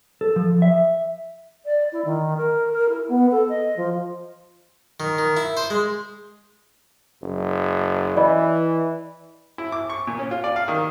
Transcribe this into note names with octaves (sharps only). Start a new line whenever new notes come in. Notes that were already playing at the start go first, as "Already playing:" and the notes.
A4
F3
E5
D5
E4
D#3
A#4
A#4
E4
B3
A4
D#5
F3
D#3
D#3
E4
C5
G#3
F#1
E3 D5 D#5 B5
E4
D6
C#6
A#2
C#4
F4
D5
F5
D#3